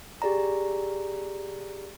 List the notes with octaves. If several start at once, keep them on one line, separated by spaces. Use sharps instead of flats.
G4 G#4 D5 A#5